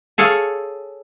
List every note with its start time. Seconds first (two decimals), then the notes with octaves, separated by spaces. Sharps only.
0.18 G#4 A4 C#5 F5 G#5